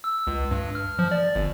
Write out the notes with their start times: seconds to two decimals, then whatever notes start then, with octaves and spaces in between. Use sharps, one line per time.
0.04 E6
0.27 C#2
0.51 G2
0.75 F6
0.99 F3
1.11 D5
1.35 G1